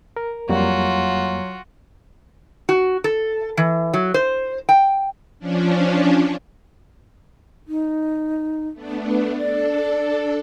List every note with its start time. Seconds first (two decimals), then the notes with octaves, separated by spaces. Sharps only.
0.17 A#4
0.49 F2 F#3 G3 A#3 F4 F#4
2.69 F#4
3.04 A4
3.57 E3
3.94 F#3
4.14 C5
4.69 G5
5.39 F3 C#4 D4
7.68 D#4
8.73 A3 B3 D4
9.08 B4
9.38 D4 A4 D5